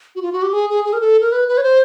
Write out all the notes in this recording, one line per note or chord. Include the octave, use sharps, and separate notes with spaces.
F#4
F4
F#4
G4
G#4
G#4
G#4
A#4
A4
A#4
B4
B4
C#5
C5